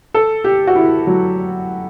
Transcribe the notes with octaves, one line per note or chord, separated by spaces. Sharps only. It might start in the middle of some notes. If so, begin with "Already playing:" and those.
A4
G4
F#4
E4
F#3